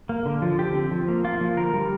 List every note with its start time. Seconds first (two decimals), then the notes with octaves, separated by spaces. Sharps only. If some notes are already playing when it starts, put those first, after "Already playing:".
0.09 A#3
0.26 D3
0.42 F3
0.59 D3 G4
0.75 C4
0.91 F3
1.08 A#3
1.24 A#3 F4
1.41 F3
1.57 D3 A#4
1.74 G3